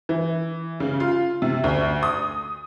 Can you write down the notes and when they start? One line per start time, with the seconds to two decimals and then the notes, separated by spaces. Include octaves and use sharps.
0.09 E3
0.80 C#3
1.00 F4
1.42 C3
1.64 D2
2.03 D#6